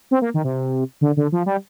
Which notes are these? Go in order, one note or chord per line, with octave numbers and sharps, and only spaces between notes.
C4
A#3
D#3
C3
D3
D3
F3
G3